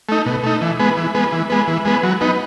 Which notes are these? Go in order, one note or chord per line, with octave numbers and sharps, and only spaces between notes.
A3 D#4
B2
A3 D#4
E3
G#3 B3
E3
G#3 B3
E3
G#3 B3
E3
G#3 B3
F#3
B3 D#4